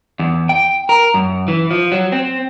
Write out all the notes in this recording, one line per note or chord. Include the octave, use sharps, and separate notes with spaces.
E2
G5
A#4
F#2
E3
F3
F#3
C4